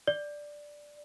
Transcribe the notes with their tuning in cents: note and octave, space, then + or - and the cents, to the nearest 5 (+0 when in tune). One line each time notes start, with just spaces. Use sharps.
D5 +5